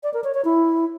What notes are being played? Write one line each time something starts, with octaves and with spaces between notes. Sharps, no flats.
D5
A#4
C#5
C#5
E4